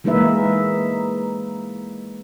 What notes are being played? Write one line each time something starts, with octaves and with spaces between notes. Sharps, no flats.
E3 G#3 A#3 D#4 B4 E5